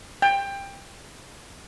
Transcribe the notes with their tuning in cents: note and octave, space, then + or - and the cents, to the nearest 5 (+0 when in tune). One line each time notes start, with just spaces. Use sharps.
G5 +20